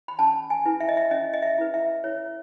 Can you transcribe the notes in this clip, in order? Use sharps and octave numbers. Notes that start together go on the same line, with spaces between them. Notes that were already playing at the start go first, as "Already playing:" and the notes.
B5
C#4 A5
G#5
E4 B4
E5
D#5
E5
C#4 D#5
D#5
E5
E4 B4
E5
E4 C#5